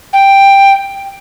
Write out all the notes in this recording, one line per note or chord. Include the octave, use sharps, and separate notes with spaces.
G5